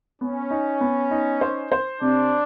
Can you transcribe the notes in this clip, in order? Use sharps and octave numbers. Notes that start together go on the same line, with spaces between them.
B3 C#4
D#4
B3
D#4
C5
C5
C3 D4